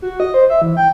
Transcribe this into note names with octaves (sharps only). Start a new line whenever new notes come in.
F#4
D#5
C5
E5
E3
G5